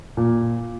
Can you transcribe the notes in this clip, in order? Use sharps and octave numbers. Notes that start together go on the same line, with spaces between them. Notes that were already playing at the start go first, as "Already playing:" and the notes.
A#2